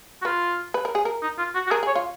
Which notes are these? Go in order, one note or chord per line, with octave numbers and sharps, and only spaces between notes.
F#4
F4 B4
B4
A#4
G#4
A#4
D#4
F4
F#4
F#4
G#4 A#4
G#4
C#5
F4